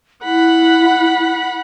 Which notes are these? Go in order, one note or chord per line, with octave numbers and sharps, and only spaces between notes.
E4 F#5 B5